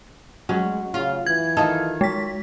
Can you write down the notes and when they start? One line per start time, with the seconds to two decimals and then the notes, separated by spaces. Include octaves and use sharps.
0.49 F#3 G#3 C#4
0.94 C#3 F4
1.27 E3 G#6
1.57 D#3 D#4 F4 A4
2.01 G#3 B6